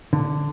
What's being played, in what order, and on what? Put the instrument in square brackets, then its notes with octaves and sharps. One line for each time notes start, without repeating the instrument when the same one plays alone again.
[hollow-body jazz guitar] D3